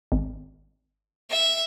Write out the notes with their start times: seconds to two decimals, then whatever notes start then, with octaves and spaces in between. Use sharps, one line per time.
0.12 G#1
1.30 E5